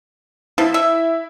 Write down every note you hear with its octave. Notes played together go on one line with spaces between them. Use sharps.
F3 E4
E5